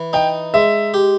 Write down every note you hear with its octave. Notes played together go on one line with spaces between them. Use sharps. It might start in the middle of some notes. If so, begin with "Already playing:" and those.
Already playing: E3
D#4 G5
G#3 E5
G4